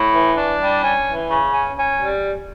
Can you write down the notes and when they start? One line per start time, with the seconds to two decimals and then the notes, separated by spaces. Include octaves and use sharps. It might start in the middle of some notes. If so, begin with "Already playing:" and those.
Already playing: A2
0.14 E3
0.37 D4
0.60 G3
0.84 C#4
1.07 E3
1.31 C#3
1.54 C#4
1.77 C#4
2.01 G3